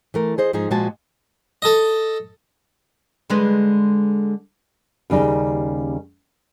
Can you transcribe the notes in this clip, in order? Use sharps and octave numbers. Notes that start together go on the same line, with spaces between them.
E3 A3 A#4
G#4 C5 D#5
G#2 F3 D#4 G#4
A#2 F3 G#3 F#4 G#5 A5
A4 D#5
D3 G#3 B4
D#2 C#3 G3 D#4